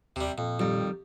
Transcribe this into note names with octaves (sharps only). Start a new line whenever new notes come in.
D#2 C3 G3
F2 A#2
F2 D#3 G3